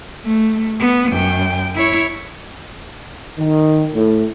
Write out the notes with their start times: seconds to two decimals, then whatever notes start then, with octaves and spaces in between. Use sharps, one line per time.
0.24 A3
0.79 B3
1.12 F#2 G5
1.75 E4 C#5
3.38 D#3
3.94 A2